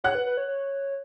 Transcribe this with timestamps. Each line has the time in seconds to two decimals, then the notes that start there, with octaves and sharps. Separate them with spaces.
0.04 C#5 F#5 F#6
0.15 B4
0.26 B4
0.37 C#5
0.48 C#5